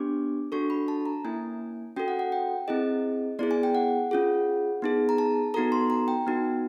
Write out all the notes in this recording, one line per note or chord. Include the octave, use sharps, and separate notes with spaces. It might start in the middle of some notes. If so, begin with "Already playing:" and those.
Already playing: B3 D4 G4 D6
D4 F#4 A4 C#6
B5
A5
A#5
A#3 C#4 E4 G#5
C#4 F#4 A4 G5
F#5
F#5
G5
C4 E4 G#4 D#5
B3 E4 G#4 D5
G#5
G5
F#5
C#4 F4 G#4
B3 D#4 G#4
A#5
A5
B3 D#4 F#4 A4 A#5
C6
A#5
G5
B3 D#4 F#4